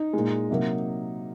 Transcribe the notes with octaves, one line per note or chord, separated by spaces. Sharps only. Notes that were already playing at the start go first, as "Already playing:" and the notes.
Already playing: D#4
A#2 G#3
C3 F#3 A#3